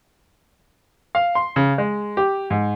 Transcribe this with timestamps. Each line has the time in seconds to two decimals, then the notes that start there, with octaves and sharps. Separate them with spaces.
1.15 F5
1.35 C6
1.56 C#3
1.78 G#3
2.17 G4
2.50 G#2